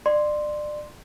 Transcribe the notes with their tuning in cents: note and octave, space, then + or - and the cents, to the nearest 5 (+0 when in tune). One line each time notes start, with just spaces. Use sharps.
D5 +30 C6 +0